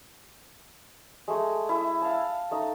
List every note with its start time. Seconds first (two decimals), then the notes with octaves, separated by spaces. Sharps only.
1.28 G#3 A3 G#4
1.69 E4 G#4 E5
2.01 F5 A5
2.51 A3 D#4